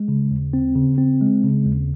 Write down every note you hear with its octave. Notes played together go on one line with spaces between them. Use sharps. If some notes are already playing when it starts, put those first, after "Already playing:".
Already playing: G#3
C#3
D#2
C4
C#3
C4
G#3
C#3
D#2